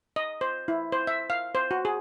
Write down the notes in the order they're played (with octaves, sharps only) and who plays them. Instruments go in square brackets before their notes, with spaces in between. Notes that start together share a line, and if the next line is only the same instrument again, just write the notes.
[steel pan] D#5
C5
E4
C5
E5
F5
C5
F#4
G#4